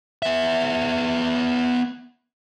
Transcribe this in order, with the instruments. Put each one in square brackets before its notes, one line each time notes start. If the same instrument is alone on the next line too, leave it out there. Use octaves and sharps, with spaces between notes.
[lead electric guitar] B3 E5